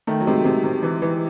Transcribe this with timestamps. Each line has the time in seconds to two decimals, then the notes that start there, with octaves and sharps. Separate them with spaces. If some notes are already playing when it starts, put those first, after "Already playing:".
0.07 D#3 A3
0.20 F#3
0.27 C3 G#3
0.45 C3 G#3
0.64 C3
0.83 E3
1.02 E3